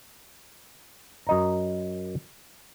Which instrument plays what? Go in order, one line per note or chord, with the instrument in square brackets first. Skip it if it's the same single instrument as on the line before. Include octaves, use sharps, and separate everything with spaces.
[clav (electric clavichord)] F#2 D#5 A#5